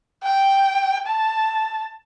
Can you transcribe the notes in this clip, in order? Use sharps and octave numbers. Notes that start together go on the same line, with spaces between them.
G5
A5